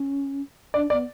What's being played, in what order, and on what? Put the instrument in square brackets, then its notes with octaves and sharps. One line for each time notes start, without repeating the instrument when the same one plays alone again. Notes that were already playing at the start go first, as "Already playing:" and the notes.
Already playing: [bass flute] C#4
[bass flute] D4 [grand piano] D5
[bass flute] B3 [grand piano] D5